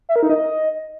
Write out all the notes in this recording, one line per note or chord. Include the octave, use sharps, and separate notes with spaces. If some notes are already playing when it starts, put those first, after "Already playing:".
E5
A#4
D#4
D#5